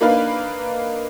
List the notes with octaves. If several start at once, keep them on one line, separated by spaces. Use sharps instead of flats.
A#3 D4 D#4 B4 F5